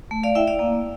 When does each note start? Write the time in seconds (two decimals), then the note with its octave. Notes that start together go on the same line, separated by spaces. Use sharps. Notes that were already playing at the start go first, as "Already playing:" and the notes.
0.11 A3
0.23 D5 F5
0.35 E4 E5 G5
0.47 D5 F5
0.59 A#3